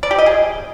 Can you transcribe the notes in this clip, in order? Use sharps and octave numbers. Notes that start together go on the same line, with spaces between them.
D5
G4
D#5
G#4